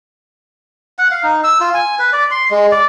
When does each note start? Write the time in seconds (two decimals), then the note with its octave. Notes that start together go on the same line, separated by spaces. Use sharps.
0.99 F#5
1.11 F5
1.23 D#4
1.44 E6
1.60 F4
1.74 G#5
1.99 B4
2.13 D5
2.31 C6
2.51 G#3
2.72 D5